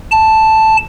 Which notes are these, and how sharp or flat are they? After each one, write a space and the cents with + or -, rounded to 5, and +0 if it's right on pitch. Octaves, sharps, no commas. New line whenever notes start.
A5 +0